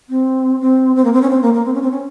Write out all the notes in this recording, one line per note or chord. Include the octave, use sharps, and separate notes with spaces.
C4
C4
C4
A#3
C4
C#4
C4
A#3
A#3
C4
C#4
C4
C#4